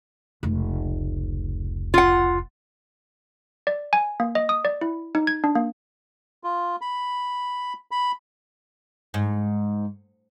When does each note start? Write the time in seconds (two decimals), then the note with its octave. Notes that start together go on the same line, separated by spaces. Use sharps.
0.43 F1 C#2
1.94 F4 F#5
3.67 D5
3.93 G#5
4.20 A#3
4.35 D#5
4.49 D#6
4.65 D5
4.81 E4
5.15 D#4
5.27 G#6
5.44 D4
5.55 A#3
6.44 F4
6.81 B5
7.91 B5
9.14 G#2